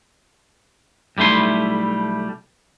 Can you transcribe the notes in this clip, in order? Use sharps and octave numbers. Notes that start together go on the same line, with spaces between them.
B1 G3 A3 E4 C6